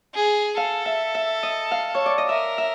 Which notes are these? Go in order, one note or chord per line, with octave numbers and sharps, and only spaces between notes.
G#4
A4 F5
E5
E5
D#5
F5
C#5
D5
D#5
A#4 E5
E5